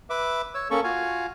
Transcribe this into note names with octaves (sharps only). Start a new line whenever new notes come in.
B4 E5 D6
C#5 E6
A#3 C#4 A4 C#6
F4 F#4 F5 G#5